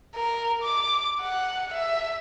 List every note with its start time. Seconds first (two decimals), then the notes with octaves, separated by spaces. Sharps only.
0.15 A#4
0.63 D6
1.22 F#5
1.74 E5